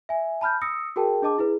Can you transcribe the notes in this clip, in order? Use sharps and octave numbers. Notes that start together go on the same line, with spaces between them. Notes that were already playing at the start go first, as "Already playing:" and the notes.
E5 G#5
A5 B5 F6 G6
D#6 E6 A#6 C#7
F#4 G#4 A#4 G5 A5
D4 G#4 D#5 A5 D6
E4 G#4 B4